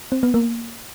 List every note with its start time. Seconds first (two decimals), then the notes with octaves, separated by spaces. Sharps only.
0.12 C4
0.23 B3
0.34 A#3